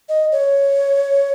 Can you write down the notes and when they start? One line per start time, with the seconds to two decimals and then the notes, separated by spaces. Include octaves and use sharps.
0.09 D#5
0.32 C#5